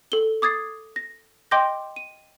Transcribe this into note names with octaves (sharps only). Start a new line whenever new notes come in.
A4 G7
D6 D#6 G#6 A6 C7
A#6
D#5 G5 C6 D6 G6 A#6
D#7